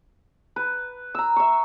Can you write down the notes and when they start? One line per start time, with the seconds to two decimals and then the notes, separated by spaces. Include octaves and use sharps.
0.56 B4
1.15 A#5 E6
1.36 E5 C#6